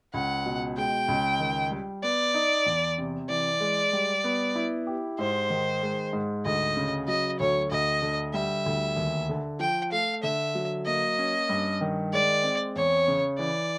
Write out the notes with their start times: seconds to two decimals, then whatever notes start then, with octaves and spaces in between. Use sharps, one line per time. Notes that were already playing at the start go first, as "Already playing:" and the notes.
0.13 C#2 F#5
0.46 B2
0.77 G#3 G5
1.08 C#2
1.40 D#3
1.71 G3
2.03 B3 D5
2.34 D#4
2.66 E2
2.98 C3
3.29 E3 D5
3.60 G#3
3.93 G3
4.24 B3
4.55 E4
4.87 G4
5.19 G#2 C5
5.50 D#3
5.82 G#3
6.13 G#2
6.45 D2 D#5
6.77 C#3
7.08 F#3 D#5
7.39 D2 C#5
7.71 D2 D#5
8.02 D3
8.33 G3 E5
8.66 D2
8.96 D#2
9.29 D3
9.60 F3 G5
9.92 A3 F5
10.23 D3 E5
10.55 F#3
10.86 A#3 D#5
11.18 C#4
11.49 G2
11.81 D#3
12.13 G#3 D5
12.43 C4
12.76 E2 C#5
13.08 C#3
13.39 E3 D5